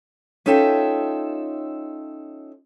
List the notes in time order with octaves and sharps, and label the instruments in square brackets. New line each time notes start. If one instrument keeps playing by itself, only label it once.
[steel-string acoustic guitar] C#4 D#4 F4 A4 E5 G5